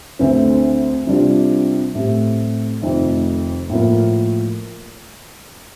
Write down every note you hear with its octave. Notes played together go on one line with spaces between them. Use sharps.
D2 D3 A3 C4
C3 G3 D4 F4
A2 A3 C4 G4
F1 F2 D#3 A3
A2 F3 A#3